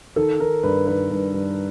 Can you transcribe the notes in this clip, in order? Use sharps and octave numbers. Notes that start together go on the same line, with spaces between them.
D#3 A4
D#3 A#4
G2 B4
D#3 B4
G2
G2